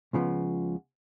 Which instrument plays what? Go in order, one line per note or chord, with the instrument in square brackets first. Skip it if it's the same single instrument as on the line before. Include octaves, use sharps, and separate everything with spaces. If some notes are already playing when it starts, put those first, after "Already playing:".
[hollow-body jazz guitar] C#2 C#3 F3 B3